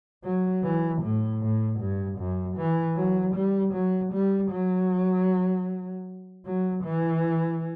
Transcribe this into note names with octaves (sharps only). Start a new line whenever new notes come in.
F#3
E3
A2
A2
G2
F#2
E3
F#3
G3
F#3
G3
F#3
F#3
E3